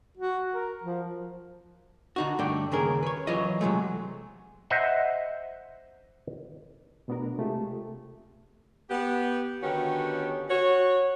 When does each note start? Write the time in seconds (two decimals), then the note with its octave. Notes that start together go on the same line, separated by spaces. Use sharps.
0.17 F#4
0.54 A#4
0.83 F3
2.16 D3 D#4 F#4
2.39 G2 D3 A3 D5 G5
2.72 D#2 C#3 G#4 A#4
3.03 B4 C#5
3.27 E3 F#3 F4 B4 C#5 D#5
3.61 C3 F#3 G#3 A3
4.70 C5 D#5 E5 F#5
7.08 B2 A3 B3 D4 F#4 A#4
7.38 C3 G#3 A3 F4 G4
8.90 B3 G4
9.62 D3 D#3 B3 C#4 F#4 G4
10.49 F#4 C#5